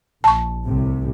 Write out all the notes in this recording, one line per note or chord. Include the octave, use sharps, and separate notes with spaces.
A#1 A5 C#6
C2 A2 C3